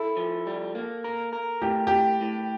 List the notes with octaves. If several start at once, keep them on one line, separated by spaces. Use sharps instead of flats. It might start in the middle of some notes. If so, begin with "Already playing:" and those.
Already playing: E4 A4
F3
G3
A#3
A#4
A#4
A2 G4
A2 G4
A2